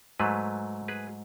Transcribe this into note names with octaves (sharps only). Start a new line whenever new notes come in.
G#2 F#3 A3 G#4 B4
G#4 B4